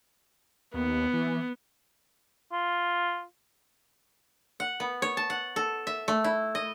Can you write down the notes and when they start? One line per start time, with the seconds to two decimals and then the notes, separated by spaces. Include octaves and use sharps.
0.74 D#2 B3
1.13 E3
2.52 F4
4.60 F#5
4.80 B3
5.02 C#5
5.17 A5
5.30 F#5
5.56 A4
5.87 E5
6.08 A3
6.24 E4
6.55 D#5